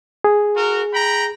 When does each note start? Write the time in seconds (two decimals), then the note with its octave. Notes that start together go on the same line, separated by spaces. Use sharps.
0.24 G#4
0.56 F#4 A#4
0.94 G5 A#5 B5